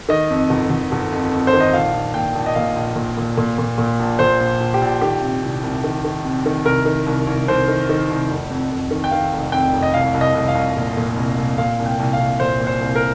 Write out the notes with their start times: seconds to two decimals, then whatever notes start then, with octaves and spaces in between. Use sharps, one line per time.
0.09 D#3 D#5
0.30 F2
0.50 G1
0.70 G1
0.92 G1
1.12 F2
1.32 F2
1.47 C5
1.53 D#3
1.61 D#5
1.73 A#1 F5
1.94 A#1
2.14 A#2 G5
2.35 A#1
2.46 D#5
2.55 A#2 F5
2.76 A#1
2.96 A#2
3.17 A#2
3.38 A#2
3.58 A#2
3.78 A#2
4.00 A#1
4.19 A#2 C5
4.41 A#1
4.60 A#1
4.74 G4
4.81 A#1
5.01 D#3 G4
5.22 C3
5.42 C2
5.63 C2
5.84 D#3
6.05 D#3
6.24 C3
6.46 D#3
6.65 C2 A#4
6.86 D#3
7.06 C2
7.27 C2
7.48 C2 C5
7.68 D#3
7.89 D#3
8.10 C2
8.30 F1
8.50 F2
8.71 F1
8.91 D#3
9.04 G5
9.11 D#3 F5
9.33 F1
9.52 F2 G5
9.73 F1
9.83 D#5
9.94 C2 F5
10.14 C2
10.21 D#5
10.35 C2
10.48 F5
10.55 C2
10.77 A#2
10.97 A#2
11.17 C2
11.38 C2
11.58 A#2 F5
11.79 C2
11.86 G5
12.00 C2
12.13 F5
12.20 C2
12.40 A#2 C5
12.60 A#2
12.67 C5
12.81 C2
12.95 A#4